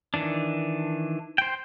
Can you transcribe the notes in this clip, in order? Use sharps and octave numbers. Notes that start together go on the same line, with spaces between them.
D#3 E3 D4
C5 G5